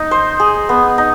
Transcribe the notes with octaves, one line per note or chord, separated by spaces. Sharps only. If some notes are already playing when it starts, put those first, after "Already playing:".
Already playing: D#4
C5
G#4
B3
D#4